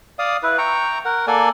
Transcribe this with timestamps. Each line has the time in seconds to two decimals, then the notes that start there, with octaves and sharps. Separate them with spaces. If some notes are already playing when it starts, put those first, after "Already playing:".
0.19 D5 F5 D#6
0.43 E4 B4
0.58 G5 A#5 C#6
1.05 A#4 F#5
1.27 A#3 A4 D5 G#5